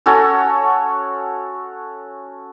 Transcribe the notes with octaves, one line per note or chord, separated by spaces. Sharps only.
C#4 F#4 A4 C#5